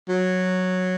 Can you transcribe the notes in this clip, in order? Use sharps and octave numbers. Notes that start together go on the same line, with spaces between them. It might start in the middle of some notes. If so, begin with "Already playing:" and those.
F#3